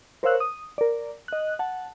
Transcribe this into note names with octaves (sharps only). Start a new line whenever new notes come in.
A#4 C5 C#5 F5 E6 F#6
D#6
A#4 D5
D#5 F#6
F#5 A5